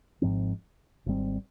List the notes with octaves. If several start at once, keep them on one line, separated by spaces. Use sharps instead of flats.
G#1 G#2 F3 C4
G#1 G#2 G3 C4